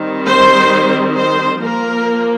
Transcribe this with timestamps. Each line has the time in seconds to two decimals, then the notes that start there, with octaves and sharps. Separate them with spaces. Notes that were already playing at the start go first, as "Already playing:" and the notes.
Already playing: D#3 G3 C4
0.27 C5
1.16 C5
1.60 F3 A#3 A#4